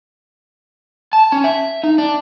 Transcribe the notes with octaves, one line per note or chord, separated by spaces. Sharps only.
A5
C#4
E5
D#4
D4